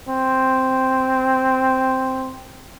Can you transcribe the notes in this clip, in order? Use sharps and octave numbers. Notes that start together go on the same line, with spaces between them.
C4